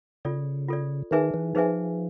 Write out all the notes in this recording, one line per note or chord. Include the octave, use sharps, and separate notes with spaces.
C#3 F4 A4 D5
F4 A4 D5
D#3 D#4 G#4 B4 E5 G#5
E3
F3 D#4 G#4 B4 E5 G#5